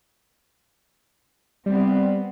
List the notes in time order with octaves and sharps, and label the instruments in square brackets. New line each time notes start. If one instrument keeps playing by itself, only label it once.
[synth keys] G3 [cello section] B3 C4